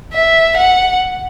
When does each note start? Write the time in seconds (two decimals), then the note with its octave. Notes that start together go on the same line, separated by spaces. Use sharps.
0.13 E5
0.57 F#5